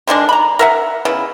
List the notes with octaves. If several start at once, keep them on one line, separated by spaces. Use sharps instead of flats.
D3 D#3 G#3 D4
A#5 B5
A#4 E5 F#5
C#3 B3 E4